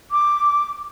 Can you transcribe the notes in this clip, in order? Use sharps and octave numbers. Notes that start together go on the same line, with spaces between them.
D6